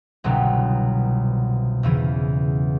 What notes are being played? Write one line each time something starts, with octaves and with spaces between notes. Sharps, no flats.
G1 C2 B2 F#3
E2 C#3 E3